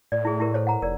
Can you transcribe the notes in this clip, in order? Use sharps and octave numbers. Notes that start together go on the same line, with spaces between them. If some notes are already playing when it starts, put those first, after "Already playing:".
A2 D5
E4 G#4
E4 G4 A#4
A4 C5 C#5
F#5 A#5
F1 A#4 D5